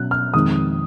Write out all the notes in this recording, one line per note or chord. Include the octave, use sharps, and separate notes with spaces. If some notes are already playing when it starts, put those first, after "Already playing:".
Already playing: B2 F#3 C#4 F#6
F6
F2 D#3 G#3 D#6